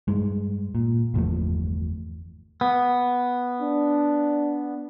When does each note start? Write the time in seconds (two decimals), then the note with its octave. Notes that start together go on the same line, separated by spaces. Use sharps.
0.08 G2 G#3
0.75 A#2
1.14 G1 E2 F3 A3
2.61 B3
3.61 D4